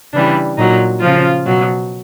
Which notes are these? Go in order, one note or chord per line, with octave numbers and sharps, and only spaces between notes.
C#3 E3 G3 D4
A#2 F#3 D#4
C#3 F3 F4
B2 F#3